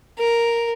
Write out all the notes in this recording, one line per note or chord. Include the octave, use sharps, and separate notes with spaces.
A#4